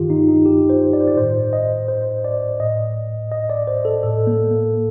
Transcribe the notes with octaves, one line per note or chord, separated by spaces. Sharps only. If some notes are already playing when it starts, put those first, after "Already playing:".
Already playing: G2 D#3 F4 G4
D#4
D#4
G4
C5
D5
C5
D5
A2 C5
D#5
C5
D5
A2 D#5
D#5
D5
C5
A4
A2 A4
A#3
A#3